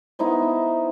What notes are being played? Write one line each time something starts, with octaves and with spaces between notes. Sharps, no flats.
B3 D#4 E4 C5